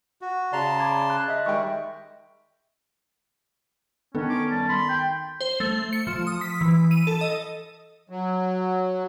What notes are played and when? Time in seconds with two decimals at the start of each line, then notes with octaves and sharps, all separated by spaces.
0.21 F#4
0.53 C#3 D5 A5 A#5 C6
0.80 B5 D6 G#6
1.10 F#6
1.28 D#5 E5
1.46 D#3 G3 G#3 G5 C#6
4.15 D#3 B3 C#4 A4
4.30 C#5 C6 D6
4.51 F#2 G3 A5
4.69 B5 C6
4.89 G5
5.41 C5
5.60 A3
5.93 C#7
6.07 F3
6.27 D#6
6.41 B6
6.61 E3
6.91 D#7
7.07 A4
7.21 D#5
8.10 F#3